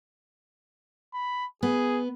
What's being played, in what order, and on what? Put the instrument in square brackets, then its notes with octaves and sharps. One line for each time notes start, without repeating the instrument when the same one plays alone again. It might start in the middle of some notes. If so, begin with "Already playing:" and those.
[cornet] B5
[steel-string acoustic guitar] B3 [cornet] G#4